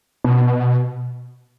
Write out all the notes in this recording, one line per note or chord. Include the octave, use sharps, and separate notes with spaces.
B2